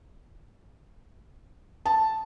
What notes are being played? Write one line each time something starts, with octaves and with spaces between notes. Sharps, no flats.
A5